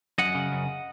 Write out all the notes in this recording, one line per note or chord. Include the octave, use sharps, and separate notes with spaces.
F#2 D#5 F#5
C#3
F#2